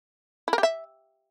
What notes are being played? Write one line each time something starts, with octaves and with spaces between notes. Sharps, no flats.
E4
A#4
G4
E5